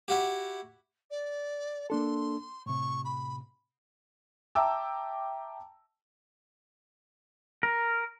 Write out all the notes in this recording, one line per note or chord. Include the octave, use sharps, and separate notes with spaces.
E4 F#4 G4
D5
A#3 D4 A4 C6
A2 C3 C#6
B5
E5 G5 A5 A#5 D6 E6
A#4